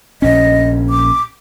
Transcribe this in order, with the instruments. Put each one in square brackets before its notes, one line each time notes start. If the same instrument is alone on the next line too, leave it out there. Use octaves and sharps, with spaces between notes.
[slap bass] A#1 C#4 [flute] D#5
[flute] D6